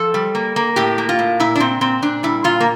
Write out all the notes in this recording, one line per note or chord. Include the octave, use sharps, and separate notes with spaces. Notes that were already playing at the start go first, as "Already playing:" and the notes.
Already playing: F3 A4
G3
A#3
A#3
A2 G4
A#3
F4
A2
A#2 E4
D4
A#2 C4
A#2 C4
A#2 D4
G3 E4
A#2 F4
A#3